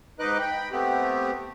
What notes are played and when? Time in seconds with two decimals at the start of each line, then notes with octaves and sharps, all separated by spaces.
0.20 G#2 D#4 B4 D#5 D6 F#6
0.39 G5 B5
0.72 A3 B3 C4 G4